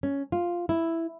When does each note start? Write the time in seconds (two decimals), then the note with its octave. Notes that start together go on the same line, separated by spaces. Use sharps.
0.03 C#4
0.32 F4
0.69 E4